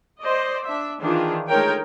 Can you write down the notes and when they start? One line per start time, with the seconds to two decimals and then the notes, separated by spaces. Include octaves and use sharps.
0.21 C5 D5 D#5
0.66 D4 E5
1.01 D#3 E3 D4 F4 G#4
1.49 G#3 A3 D#4 A#4 C#5 G5